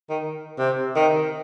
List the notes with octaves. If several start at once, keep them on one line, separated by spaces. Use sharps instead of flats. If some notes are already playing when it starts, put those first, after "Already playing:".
D#3
C3
D#3